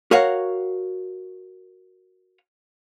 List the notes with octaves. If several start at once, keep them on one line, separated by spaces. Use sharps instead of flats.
F#4 A#4 C#5 F5 F#5